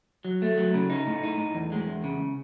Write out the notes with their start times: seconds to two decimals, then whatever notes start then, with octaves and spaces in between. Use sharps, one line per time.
0.25 F#3
0.42 A3
0.58 F#3
0.74 C#3
0.90 D#4
1.07 A2
1.23 D#4
1.39 A2
1.55 E2
1.72 G#3
1.87 E2
2.04 C#3